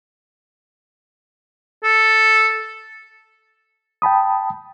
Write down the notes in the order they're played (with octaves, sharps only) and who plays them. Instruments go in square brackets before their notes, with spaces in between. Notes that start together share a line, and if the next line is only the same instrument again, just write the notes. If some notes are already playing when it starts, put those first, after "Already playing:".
[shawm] A4
[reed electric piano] G5 A5 B5 D#6